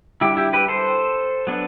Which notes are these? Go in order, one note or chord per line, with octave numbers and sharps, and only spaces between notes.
G3 D4 E4 G4
E4 G4
G4 B4
A4 C5
F#3 B3 D4